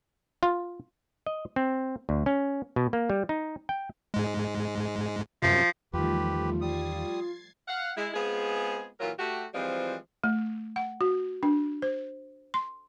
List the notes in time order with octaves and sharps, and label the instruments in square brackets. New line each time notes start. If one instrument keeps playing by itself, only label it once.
[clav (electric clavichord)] F4
D#5
C4
D2
C#4
B2
A#3
G3
D#4
G5
[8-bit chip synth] G#2 G#3
[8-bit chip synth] F#2 C3 [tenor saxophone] F3
[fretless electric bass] E2 D#3 [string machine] F3 G3 A3 [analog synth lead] F4 [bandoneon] G4 B4
[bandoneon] G3 D#6 [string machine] G#6 A6 C7
[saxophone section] F5 F#5
G#3 E4
G#3 B3 C4 F4 G#4
A#2 E3 F#3 F4 A#4
A3 F#4 G4
E3 F3 G3 G#3 C4 F4
[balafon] A3
F#5
F#4
D4
C5
C6